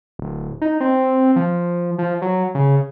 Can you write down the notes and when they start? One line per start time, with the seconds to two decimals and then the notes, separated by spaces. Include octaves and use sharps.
0.19 D1
0.61 D#4
0.80 C4
1.36 F3
1.98 F3
2.22 F#3
2.55 C#3